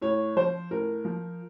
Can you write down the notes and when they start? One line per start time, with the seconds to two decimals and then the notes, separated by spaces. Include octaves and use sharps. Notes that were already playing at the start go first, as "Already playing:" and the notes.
0.02 A2 C#5
0.37 F3 C5
0.71 A2 A#4
1.05 F3